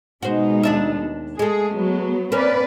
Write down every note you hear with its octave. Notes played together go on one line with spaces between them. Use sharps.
B2 G#3 D#4 F#4 C5
D#2 D4 E5
G#3 A3 G#4
F#3 B3
A#3 C4 C#4 B4 D5